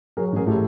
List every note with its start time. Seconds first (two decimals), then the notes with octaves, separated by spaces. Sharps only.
0.17 F#3 G#4 A#4
0.33 A1 G#4 A#4
0.47 A2 G4 A4